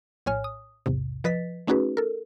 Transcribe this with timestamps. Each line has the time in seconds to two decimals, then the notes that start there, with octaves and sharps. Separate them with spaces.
0.26 A#1 A2 C#5 G#5 F6
0.44 D#6
0.86 B1 E2 G#2 C3
1.24 F3 B4 D#5 A6 B6
1.67 A3 C#4 D#4 F#4 G#4 B4
1.97 A4 A#4